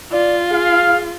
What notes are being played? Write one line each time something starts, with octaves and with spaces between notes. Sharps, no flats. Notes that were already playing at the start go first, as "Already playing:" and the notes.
F4 D5
G#4 F5